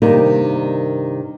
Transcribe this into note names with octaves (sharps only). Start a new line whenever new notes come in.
G2 C3 D#3 A#3 C4 D#4